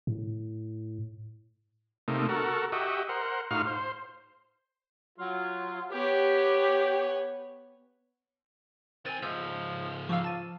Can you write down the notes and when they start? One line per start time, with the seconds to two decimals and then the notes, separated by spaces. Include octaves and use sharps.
0.07 A2
2.08 C3 A3 A#3 D#4
2.29 F#4 A4 A#4
2.72 F#4 G4 D#5 E5
3.09 A#4 C5 F#5
3.51 A2 D#4 F4 F#4 F5 F6
3.67 C5
5.19 F#3 F4
5.92 B3 G4 C#5
9.05 D#3 C4 G#5 G#6 A6 D#7
9.22 C#2 G#2 F3 E6 G6
10.09 F3 F5 C#6 D6 E6
10.24 A5 A6 D#7